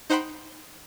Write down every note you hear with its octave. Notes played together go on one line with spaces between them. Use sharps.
D#4 C5 F#5 G5 B5 C6